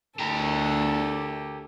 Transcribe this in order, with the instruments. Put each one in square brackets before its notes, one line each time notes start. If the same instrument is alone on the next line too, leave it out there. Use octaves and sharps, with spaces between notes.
[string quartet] D2 A4 [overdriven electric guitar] G4 A#4